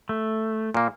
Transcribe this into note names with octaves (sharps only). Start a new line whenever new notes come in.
A3
A#2 A#3